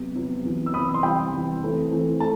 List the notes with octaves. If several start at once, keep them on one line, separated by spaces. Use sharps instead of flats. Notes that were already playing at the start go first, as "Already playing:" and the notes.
Already playing: C3 F#3 B3
C3 F#3 B3
C3 E3 B3
E6
C3 E3 B3 B5 D#6
C6
C3 E3 G3 G5 B5
C3 E3 G3
E3 A3 C4
E3 A3 C4
A3 A5